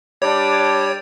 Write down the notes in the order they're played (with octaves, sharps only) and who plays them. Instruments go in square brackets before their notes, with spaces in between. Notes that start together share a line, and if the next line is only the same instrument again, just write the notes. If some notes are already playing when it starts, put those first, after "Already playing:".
[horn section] G3 D4 D5 [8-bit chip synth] C#5